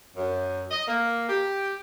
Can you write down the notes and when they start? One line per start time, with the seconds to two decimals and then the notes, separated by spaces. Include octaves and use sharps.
0.16 F#2
0.71 D#5
0.87 A#3
1.28 G4